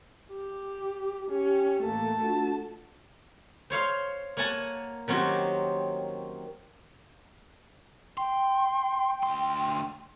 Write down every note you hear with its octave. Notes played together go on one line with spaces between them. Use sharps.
G4
C#4 G4
A1 A3 A#3 A5
D4 F4 F#4
C5 C#5 F5 C6
A#3 C#5 F#5 G#5 A5
D#3 F#3 C4 C#4 F#4 G4
G5 C6
D2 C6